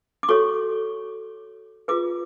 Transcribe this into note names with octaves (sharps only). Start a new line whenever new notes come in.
D6
F#4 A4 C#5 C#6
F4 G#4 B4 D6